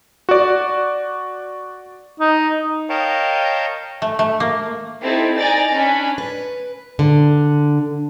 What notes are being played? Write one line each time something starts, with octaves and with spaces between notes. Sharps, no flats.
F#4 D5
D#4
A#4 C#5 D#5 F5 G5 A5
A3
A3
A#3
C4 D#4 E4 G4 A4
D#4 D5 G#5 A#5 A6 D7
C#4 D4 G#5 B5
B4
D3